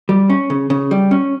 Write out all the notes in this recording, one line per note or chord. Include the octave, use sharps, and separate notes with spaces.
G3
C#4
C#3
C#3
G3
C#4